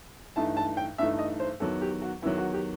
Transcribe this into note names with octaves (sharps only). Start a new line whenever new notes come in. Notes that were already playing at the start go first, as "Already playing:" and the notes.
G2 E3 A3 D#4 A5
A5
G5
G2 E3 A3 D#4 E5
D#5
C5
E2 D#3 F#3 A4
G4
F#4
E2 D#3 F#3 E4
F#4
G4